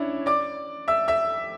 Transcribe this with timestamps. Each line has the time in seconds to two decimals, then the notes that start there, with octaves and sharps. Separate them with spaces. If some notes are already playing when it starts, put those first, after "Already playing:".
Already playing: C#4 D4 E4 C#5
0.26 D5 D6
0.88 E5 E6
1.08 E5 E6